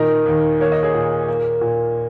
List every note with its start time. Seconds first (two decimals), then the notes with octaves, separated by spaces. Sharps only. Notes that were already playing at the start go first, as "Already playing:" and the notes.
Already playing: A#2 D#3 A#4 D#5
0.26 D#2
0.60 A#3 C#5
0.72 D#5
0.83 G#4 C#5
0.94 A#2
1.28 A#3
1.61 A#2